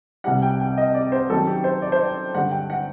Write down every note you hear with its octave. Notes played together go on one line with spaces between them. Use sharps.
C2 C3 G3 F#5
G5
G5
D#5
D5
C5
F#2 D#3 F#3 A4
G4
C5
D5
C5
D5
G2 D3 G3 F#5
G5
F#5